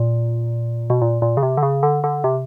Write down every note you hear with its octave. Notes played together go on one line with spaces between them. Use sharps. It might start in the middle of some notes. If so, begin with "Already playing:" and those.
Already playing: A#2
B2
A#2
A#2
C#3
C3
D3
C#3
D3
D3
C3